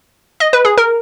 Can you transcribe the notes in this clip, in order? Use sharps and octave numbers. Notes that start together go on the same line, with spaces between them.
D#5
B4
G#4
A#4